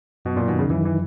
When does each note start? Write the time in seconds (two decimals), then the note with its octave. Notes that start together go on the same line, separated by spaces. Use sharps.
0.25 F#2 B2
0.36 A#2
0.48 B2 D#3
0.59 C#3
0.70 F#2 E3
0.85 E3